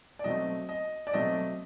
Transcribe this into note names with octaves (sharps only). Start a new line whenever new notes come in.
D5
B2 F#3 A3 C4 D#5
D#5
D5
B2 F#3 A3 C4 D#5